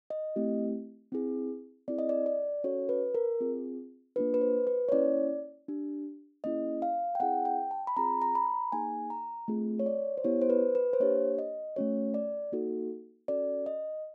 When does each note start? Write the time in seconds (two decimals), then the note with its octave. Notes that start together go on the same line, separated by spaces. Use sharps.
0.10 D#5
0.36 A3 C4 E4 G4
1.12 C4 E4 G#4
1.88 C4 E4 G#4 D5
1.99 D#5
2.09 D5
2.26 D5
2.64 C#4 F#4 A4 C#5
2.89 B4
3.15 A#4
3.40 C4 F4 G#4
4.16 A#3 D4 F4 B4
4.34 B4
4.41 C5
4.67 B4
4.89 C#5
4.92 A#3 C#4 E4 D5
5.68 D4 G4
6.44 A#3 C#4 E4 G#4 D#5
6.82 F5
7.15 G5
7.20 C4 E4 G#4 F#5
7.45 G5
7.71 A5
7.87 B5
7.96 C4 F4 G#4 A#5
8.22 A#5
8.35 B5
8.46 A#5
8.72 A#3 D#4 G#4 G#5
9.10 A#5
9.48 A3 C4 F4 G#4
9.79 C#5
9.86 D5
10.17 C5
10.24 B3 E4 G4 C#5
10.42 C5
10.50 B4
10.75 B4
10.93 C5
11.00 A#3 D4 G4 C#5
11.39 D#5
11.76 A3 C#4 F#4 C#5
12.14 D5
12.52 A#3 D#4 F#4 A4
13.28 C#4 F#4 A4 D5
13.66 D#5